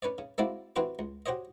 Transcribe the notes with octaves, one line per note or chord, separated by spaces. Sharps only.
C#4 B4 C#5 D5
C#3
G#3 A#3 C4 E4 F#4 D5
E3 C4 F#4 G4 B4 C5
C#2
F#4 G4 C5 C#5 D#5